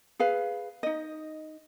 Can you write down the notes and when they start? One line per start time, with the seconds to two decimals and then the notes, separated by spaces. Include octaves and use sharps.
0.19 G#4 B4 F5
0.83 D#4 D#5